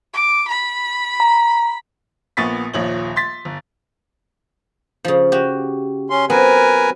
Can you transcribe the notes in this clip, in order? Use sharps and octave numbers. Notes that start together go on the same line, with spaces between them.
D6
B5
A#5
A#1 A#2 B3 C#6 A6 B6
D#1 A#1 F3 C#5 F#7
C6 A6 B6
G1
C#3 F3
F#4 G4
C#4 C6
F#3 B3 C4 A#4 B4 G#5